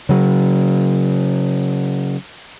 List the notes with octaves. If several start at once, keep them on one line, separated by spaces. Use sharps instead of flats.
C#3 F#3